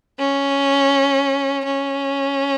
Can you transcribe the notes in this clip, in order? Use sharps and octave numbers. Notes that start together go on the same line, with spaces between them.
C#4
C#4